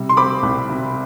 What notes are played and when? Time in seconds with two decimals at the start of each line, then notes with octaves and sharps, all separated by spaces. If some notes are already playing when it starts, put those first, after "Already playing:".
Already playing: C3 G3
0.09 C6
0.17 C4 B5 D6
0.43 C2
0.69 C3